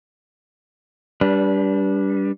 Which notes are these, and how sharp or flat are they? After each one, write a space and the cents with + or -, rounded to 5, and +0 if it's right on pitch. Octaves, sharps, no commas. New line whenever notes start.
G3 +0 D4 -30 B4 -25